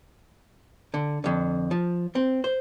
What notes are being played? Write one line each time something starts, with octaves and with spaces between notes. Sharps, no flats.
D3
F2 D3
F3
C4
C5